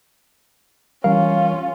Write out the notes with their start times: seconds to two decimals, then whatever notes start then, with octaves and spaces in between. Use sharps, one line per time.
1.04 E3 G3 C#4 F4 A#4 F5